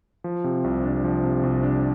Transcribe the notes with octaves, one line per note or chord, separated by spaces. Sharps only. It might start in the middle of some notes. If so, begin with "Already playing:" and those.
F3
C3
C2
D4
F3
C3
C2
D4